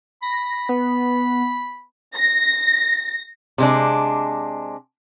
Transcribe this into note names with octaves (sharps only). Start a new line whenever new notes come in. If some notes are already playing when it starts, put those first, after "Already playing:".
B5 A#6
B3
A#6
C3 G#3 D4